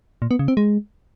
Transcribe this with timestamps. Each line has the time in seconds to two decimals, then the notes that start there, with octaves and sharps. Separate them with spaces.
0.22 A#2
0.31 B3
0.39 C#3
0.48 C4
0.57 G#3